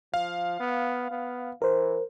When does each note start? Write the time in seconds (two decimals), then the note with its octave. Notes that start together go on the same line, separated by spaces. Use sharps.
0.14 F3 F5
0.60 B3
1.11 B3
1.62 E3 A#4 C5